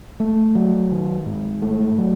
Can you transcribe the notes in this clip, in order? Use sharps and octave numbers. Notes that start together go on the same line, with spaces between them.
A3
F#3
D#3
G#2
A3
F#3